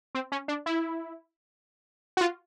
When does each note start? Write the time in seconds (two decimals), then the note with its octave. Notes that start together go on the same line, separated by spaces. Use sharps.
0.15 C4
0.32 C#4
0.48 D4
0.66 E4
2.17 F#4
2.21 F4